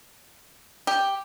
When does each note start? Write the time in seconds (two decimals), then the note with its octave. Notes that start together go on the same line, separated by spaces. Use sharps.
0.87 G4